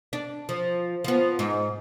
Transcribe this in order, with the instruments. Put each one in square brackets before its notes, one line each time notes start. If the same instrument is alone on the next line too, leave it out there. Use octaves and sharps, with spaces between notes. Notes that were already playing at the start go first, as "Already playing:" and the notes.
[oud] D4
F3
F3 B3
G#2